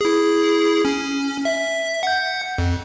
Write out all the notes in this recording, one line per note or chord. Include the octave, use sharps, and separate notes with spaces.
E4 G#4
C#4
E5
F#5 G6
F2